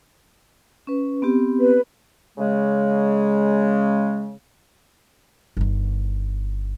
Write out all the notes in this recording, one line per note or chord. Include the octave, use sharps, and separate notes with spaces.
C#4 B4
B3 C4 G4
B4
C#3 G#3
G1 D#3